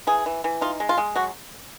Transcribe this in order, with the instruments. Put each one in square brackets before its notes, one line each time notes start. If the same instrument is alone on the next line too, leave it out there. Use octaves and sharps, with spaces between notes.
[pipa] E3 G#4
E3
E3
D#4 F4
G#3
F4
G#3
F#3 F#4